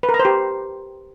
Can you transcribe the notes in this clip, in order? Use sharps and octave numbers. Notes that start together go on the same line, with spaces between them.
B4
A#4
A#5
C5
G4